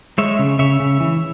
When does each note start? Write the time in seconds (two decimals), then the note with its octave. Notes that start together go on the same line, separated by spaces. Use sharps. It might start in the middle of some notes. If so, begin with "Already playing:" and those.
0.18 G#3 C#5 E5
0.39 C#3
0.59 C#3 C#5 E5
0.80 C#3
1.00 E3